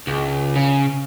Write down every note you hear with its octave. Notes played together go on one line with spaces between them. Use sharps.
C#2
C#3